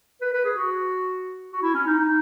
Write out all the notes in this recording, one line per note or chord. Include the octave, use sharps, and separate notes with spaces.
B4
B4
G#4
F#4
F#4
E4
C#4
D#4
D#4